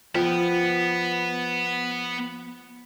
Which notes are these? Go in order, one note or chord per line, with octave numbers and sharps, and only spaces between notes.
F3 B3 G5